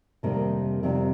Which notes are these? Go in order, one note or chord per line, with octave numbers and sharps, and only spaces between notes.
F2 C3 D#3 G3 A#3
F2 C3 D#3 G3